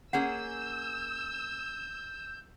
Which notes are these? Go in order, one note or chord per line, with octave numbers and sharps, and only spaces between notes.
A#3 C#4 G#4 F#5 E6 G6